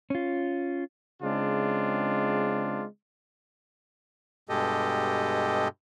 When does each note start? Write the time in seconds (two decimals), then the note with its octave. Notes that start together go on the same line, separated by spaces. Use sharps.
0.10 C#4 F4
1.23 C#3 G#3 C4 D4 F4
4.49 G2 B2 G#3 G4 A4 D#5